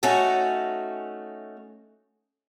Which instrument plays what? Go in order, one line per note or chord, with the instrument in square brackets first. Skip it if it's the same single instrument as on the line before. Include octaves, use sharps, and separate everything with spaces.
[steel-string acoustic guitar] A3 C#4 D#4 F#4 A4